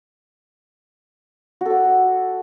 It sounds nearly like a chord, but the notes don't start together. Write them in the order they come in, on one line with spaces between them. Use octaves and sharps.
F#4 A4 D5